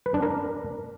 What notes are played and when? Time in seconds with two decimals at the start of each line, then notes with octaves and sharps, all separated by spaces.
0.06 B4
0.14 D4
0.22 A#4